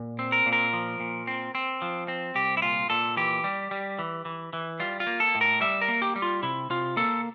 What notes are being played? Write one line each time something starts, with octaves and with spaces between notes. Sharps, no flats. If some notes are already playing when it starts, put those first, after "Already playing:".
Already playing: A#2
C4
A#4
A#2
A#4
F3
A#2
C4
C4
F3
C4
C2 G4
E4
A#2 F4
A#2 A4
E3 G4
G3
G3
E3
E3
E3
G3 F4
F4
A#3
A4
A2
A#4
G3 E5
A#4
A#3
G4
G3
F4
C3 E4
C3 F4
A#3 A4